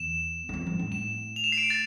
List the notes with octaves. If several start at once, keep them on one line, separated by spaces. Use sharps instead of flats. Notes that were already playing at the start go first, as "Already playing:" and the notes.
Already playing: E2 E7
E2
F2
G2
A2
E7
F7
E7
C7
D7
A6